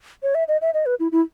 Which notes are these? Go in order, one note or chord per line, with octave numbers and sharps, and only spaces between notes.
C#5
E5
D#5
E5
D#5
B4
E4
E4